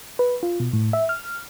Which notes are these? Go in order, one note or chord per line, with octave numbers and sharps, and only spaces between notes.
B4
F4
B2
A2
E5
F6